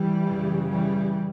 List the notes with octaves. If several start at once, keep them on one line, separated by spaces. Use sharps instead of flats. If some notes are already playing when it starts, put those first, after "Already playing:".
Already playing: E3 G3
F#2 C#3
E3 G3